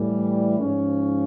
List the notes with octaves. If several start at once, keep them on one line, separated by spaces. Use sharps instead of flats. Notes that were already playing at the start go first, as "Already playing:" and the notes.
Already playing: A2 E3 G3
G#2 F3 C#4